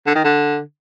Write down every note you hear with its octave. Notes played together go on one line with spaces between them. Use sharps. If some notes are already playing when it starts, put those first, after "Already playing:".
D3
D#3
D3